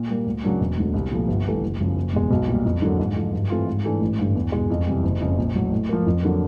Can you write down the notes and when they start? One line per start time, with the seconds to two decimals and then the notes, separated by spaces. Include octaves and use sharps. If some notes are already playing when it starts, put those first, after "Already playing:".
Already playing: A#2
0.09 G3 A#3
0.26 D2
0.43 C#3 F#3 A#3 D4
0.60 E1
0.77 D2 D3
0.94 C2
1.12 A#2 F3 A3
1.28 G1
1.46 G2 E3 A3
1.62 F#1
1.80 F#2 C#3 F3
1.96 F#1
2.13 E2 B2 G#3
2.31 B1
2.48 A#2 G3
2.65 F2
2.82 D3 F#3 A#3
2.99 G#2
3.16 F3 A3
3.33 G2
3.50 E3 A3 C4 F4
3.67 G#2
3.84 E3 A3 D4
4.01 A1
4.19 G2 D3
4.35 E2
4.52 B2 G#3
4.70 F2
4.86 C3 E3 G3
5.03 F#1
5.21 F2 C#3
5.38 A#1
5.55 A2 F#3
5.72 A2
5.89 F3 A#3
6.06 F2
6.23 D3 F#3 A#3